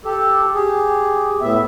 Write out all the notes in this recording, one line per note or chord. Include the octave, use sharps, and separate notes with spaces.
G4 A4
G4 G#4
A2 B3 E5